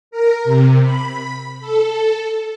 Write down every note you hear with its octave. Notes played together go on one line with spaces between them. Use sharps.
A#4
C3
B5
A4